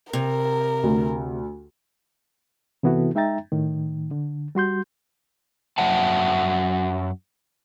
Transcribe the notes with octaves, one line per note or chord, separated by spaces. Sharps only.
C3 A#4
D2
C3 E3 B3 E4 F#4 A4
G#3 D#4 E5 G5 A#5 A6
A2 D#3
D3
G3 F#4 C6 G6
F#2 F#3 E5 F#5 A5